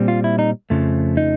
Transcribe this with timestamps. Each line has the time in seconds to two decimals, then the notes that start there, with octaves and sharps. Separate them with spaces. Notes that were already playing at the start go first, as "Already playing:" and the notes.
Already playing: A#2 G3 C4
0.08 F4
0.24 E4
0.39 D#4
0.70 F2 C#3 F3 A3
1.17 D#4